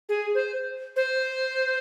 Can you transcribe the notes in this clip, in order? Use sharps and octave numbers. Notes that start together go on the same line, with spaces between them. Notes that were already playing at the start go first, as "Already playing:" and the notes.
G#4
C5
C5